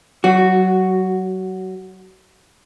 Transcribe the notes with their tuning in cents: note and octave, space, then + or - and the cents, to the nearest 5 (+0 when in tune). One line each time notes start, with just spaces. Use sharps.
F#3 +25 F#4 +0